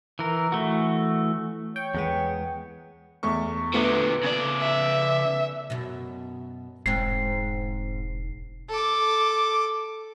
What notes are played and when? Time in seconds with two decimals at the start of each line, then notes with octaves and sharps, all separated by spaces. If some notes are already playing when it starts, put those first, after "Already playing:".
0.19 E3 A#4
0.52 E3 A3 F#4
1.76 C#5 G5
1.95 E2 G#3 B3
3.23 E2 A3 C#6
3.74 A#2 D3 A3 B3
4.24 C#3 D5
4.60 E5
5.70 F#2 B2
6.86 E1 G#2 C4 C7
8.69 A4 D6